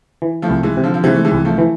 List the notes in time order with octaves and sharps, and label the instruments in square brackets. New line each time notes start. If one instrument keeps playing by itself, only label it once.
[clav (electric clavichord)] E3
[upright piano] F3 A3
[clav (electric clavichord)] C2
[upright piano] E3 G#3
[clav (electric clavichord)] C3
[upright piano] D3 F3
F3
[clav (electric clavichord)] C3 [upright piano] E3 G#3
[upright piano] A3
E3 G#3
[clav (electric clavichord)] C2
[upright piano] F3 A3
[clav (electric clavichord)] E3